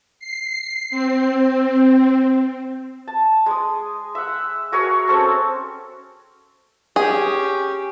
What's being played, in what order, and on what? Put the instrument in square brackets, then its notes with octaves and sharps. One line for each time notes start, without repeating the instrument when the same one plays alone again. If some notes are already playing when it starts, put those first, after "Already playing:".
[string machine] C7
C4
[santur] A5
G#3 D#6
E5 F#5
F#4 G#4 A#4 C#5
C4 C#4 A4
[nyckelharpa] C#4 G4 [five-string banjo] G#4